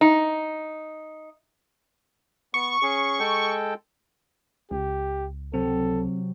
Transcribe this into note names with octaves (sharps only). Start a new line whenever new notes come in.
D#4
B3 C#6
C#4 G#4
G#3 A4 G5
C#2 G4
C3 F#3 C4 A4